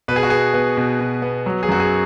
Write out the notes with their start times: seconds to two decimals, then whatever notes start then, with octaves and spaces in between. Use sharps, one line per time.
0.08 B2 B4
0.16 G#4
0.23 F#4
0.30 B3 G#4
0.54 B3
0.77 B2
1.00 B2
1.22 B3
1.46 F#3
1.63 G#4
1.69 F#2 F#4
1.80 G#4